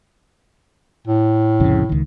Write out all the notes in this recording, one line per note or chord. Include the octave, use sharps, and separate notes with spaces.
A2
C2 F2 C#3
C#2 D#3